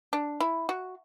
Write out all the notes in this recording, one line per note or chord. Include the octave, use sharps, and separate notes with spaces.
D4
E4
F#4